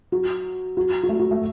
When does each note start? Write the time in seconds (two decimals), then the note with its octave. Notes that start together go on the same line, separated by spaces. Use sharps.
0.12 F#3
0.77 F#3
1.03 F#3
1.09 A3
1.19 F#3
1.31 A3